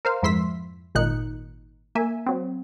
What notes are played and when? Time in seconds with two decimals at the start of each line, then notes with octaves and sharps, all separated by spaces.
0.05 A#4 C5 F5
0.23 F2 G#2 E4 C6 E6 B6
0.95 G#1 A#2 D#4 F#6 C#7
1.95 A#3 E5 G#5
2.26 F#3 C4